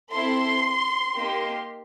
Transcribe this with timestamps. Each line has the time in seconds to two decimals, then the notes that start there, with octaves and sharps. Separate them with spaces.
0.13 C4 E4 A4 C6
1.13 A#3 D#4 G4